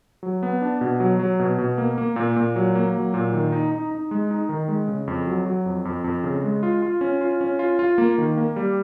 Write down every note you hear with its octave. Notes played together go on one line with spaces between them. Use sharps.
F#3
B3
D4
B2
F#3
F#3
B2
B2
A#3
A#3
A#2
A#2
F#3
A#3
F#3
A#2
D#3
D#4
D#4
D#4
G#3
D#4
D#3
G#3
C#3
F2
F#3
F#3
F2
F2
F2
C#3
G#3
F4
F4
C#4
F4
C#4
F4
F4
A#3
D#3
A#3
G3